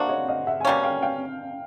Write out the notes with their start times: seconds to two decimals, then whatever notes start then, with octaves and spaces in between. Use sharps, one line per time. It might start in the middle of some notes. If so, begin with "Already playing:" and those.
Already playing: A#3 D4 F#4 C5 D5 E5
0.09 C#5 D#5
0.28 D#5 F5
0.47 E5 F#5
0.61 G#5
0.65 B2 G3 A#3 C#4 F5 G5
0.84 F5 G5
1.02 F5 G5